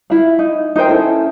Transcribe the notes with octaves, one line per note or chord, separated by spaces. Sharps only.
E4 F5
D#4
D#4 A#4 C5 G5
C#4 E4 A4